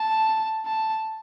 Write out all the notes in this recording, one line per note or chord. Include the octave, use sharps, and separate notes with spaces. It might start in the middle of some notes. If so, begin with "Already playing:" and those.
Already playing: A5
A5